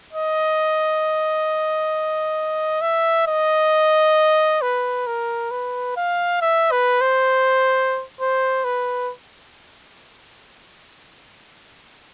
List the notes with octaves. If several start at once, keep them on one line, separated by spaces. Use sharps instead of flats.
D#5
E5
D#5
B4
A#4
B4
F5
E5
B4
C5
C5
B4